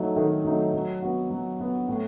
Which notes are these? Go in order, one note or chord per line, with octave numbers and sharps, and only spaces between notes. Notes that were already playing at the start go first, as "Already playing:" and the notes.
Already playing: F#3 A3 D#4
D#3
F#3 A3 D#4
F#3
B3 F#4
F#3
B3 F#4
A2